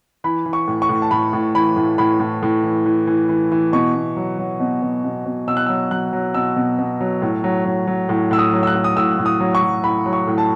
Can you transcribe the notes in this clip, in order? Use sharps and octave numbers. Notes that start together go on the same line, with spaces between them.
E3 B5
E3
C#6
A2
C#6
A2
A5
A2 B5
A2
E3 B5
A2
A2 B5
A2
A2
E3
E3
E3
E3
E3
B2 C#6
B2
F#3
F#3
B2
B2
B2
B2
B2 E6
F#6
F#3 E6
F#3 F#6
F#3
B2 E6
B2
B2
F#3
A2
F#3
F#3
F#3
A2
A2 E6
D#6
F#3
E6
F#6
A2
D#6
A2 E6
A2
D#6
F#3
C#6
F#3
A2 B5
F#3
C#6
A2
A5